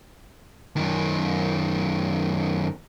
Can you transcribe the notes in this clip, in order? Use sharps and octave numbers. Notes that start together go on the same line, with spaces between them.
F#2 D#3